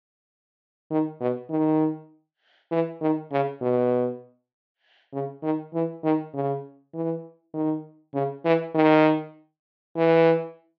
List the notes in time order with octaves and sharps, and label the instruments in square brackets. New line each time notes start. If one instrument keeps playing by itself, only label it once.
[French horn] D#3
B2
D#3
E3
D#3
C#3
B2
C#3
D#3
E3
D#3
C#3
E3
D#3
C#3
E3
D#3
E3